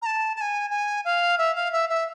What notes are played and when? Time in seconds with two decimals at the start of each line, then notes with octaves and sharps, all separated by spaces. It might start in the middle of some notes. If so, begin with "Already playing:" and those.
0.02 A#5
0.06 A5
0.36 A5
0.41 G#5
0.70 G#5
1.05 F5
1.38 E5
1.55 F5
1.73 E5
1.90 E5